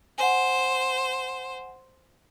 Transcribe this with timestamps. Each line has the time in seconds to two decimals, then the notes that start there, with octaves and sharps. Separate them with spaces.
0.18 C5 F#5 G#5